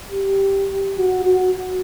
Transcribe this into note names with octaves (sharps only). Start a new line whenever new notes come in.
G4
F#4
F#4